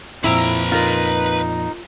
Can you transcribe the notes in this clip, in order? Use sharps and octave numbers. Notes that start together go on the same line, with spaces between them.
F2 A#2 C4 E4 B4 A#5
D#4 F4 A#4